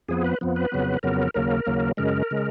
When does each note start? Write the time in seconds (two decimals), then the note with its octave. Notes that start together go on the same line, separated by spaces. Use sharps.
0.09 F2 F3 B3 G#4
0.24 B4
0.41 F2 F3 B3
0.56 B4
0.72 F2 C#3 F#3 B3
1.03 F2 C#3 F#3 B3 A#4
1.34 D#2 C#3 F#3 A#3 A#4
1.67 D#2 C#3 F#3 A#3
1.97 F#2 C#3 G#3 A#4
2.31 C#3 G#3